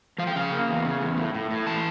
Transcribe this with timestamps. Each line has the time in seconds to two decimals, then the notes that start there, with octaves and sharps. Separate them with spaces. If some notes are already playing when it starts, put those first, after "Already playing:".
0.18 F3 F5
0.27 G5
0.36 C#3 F5
0.52 A#3
0.68 E2
0.85 C#3
1.02 E2
1.17 A2
1.35 A2
1.51 A2
1.67 E3 A5